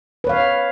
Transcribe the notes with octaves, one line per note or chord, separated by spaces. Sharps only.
B4 C#5 F5